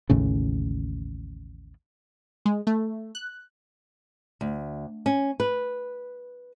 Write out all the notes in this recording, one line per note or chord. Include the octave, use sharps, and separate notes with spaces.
A1 D#2 A2 C#3
G#3
A3
F#6
D2
C#4
B4